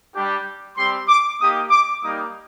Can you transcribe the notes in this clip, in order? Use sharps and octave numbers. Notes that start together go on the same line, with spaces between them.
G3 D4 G4
G3 C4 G4 C6
D6
A#3 D#4 G4 D#6
D6
G3 A#3 D#4 G4 D#6